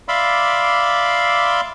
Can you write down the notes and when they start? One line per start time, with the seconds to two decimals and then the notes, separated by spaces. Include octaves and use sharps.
0.08 D5 E5 F5 B5 C6 D6